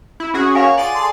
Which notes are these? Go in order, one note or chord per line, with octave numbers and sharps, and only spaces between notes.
E4
C#4 F#4 G#4
A#3 C#5 F5 G#5
F4 G#4 D5 F#5 A6 D#7
G#4 A4 C6